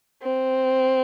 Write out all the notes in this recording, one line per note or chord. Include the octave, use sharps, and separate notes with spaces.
C4